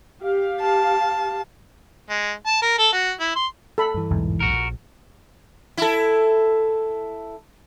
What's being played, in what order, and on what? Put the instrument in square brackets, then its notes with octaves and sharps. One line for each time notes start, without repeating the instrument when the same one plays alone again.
[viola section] G4 F5
[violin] A5
[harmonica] G#3
A5
A#4
A4
F#4
E4
C6
[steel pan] A4 B5
[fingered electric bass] G2 E3
[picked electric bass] B1 E2 G#2
[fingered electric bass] A#1 [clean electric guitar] F#4 A#4
[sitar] E4 A4